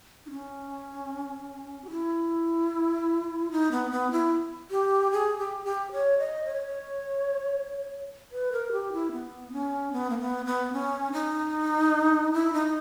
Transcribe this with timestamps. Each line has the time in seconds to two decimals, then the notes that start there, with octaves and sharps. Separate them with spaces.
0.26 D#4
0.31 C#4
1.84 G4
1.91 E4
3.52 D#4
3.71 B3
3.91 B3
4.11 E4
4.71 G4
5.12 G#4
5.38 G4
5.65 G4
5.92 C#5
6.19 D#5
6.45 C#5
8.32 B4
8.52 A#4
8.72 G4
8.93 E4
9.12 B3
9.53 C#4
9.92 B3
10.10 A#3
10.19 B3
10.46 B3
10.73 C#4
11.13 D#4
12.33 E4
12.53 D#4